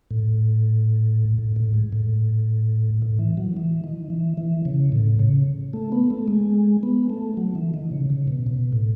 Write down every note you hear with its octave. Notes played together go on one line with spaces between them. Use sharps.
A2
A2
A2
G#2
A2
A2
E3
F#3
E3
D#3
E3
E3
C#3
A2
C#3
A3
B3
A3
G#3
B3
A3
F#3
E3
D#3
C#3
C#3
B2
B2
A2